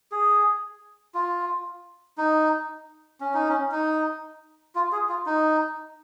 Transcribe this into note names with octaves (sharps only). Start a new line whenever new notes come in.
G#4
F4
D#4
C#4
D#4
C#4
D#4
F4
G#4
F4
D#4